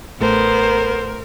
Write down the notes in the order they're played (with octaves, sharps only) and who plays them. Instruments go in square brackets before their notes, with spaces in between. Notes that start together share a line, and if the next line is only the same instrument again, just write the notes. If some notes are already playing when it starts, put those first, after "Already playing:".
[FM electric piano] A1 A3 A4 [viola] B3 C5 [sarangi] A#4